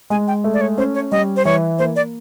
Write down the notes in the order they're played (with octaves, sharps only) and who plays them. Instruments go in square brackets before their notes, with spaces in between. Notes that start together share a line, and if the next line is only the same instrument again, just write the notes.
[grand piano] G#3 [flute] G#5
[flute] G5
[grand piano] A3
[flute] D5
C#5
[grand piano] C#4 [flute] C5
[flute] C#5
[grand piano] G3 [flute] D#5
[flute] C5
[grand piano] E3 [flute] C#5
[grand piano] A#3 [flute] C5
[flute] D5